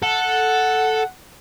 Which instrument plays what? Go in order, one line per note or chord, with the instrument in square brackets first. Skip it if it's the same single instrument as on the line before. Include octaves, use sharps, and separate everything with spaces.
[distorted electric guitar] A4 [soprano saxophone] F#5